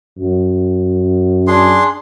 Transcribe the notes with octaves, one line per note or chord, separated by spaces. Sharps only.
F#2
D4 G#4 C6